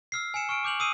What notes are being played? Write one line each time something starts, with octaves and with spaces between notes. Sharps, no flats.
E6 F6 C7
G#5 C7 C#7 E7
C#6 F6 D7
D6 G6 F7 F#7
D#6 E6 C7 D#7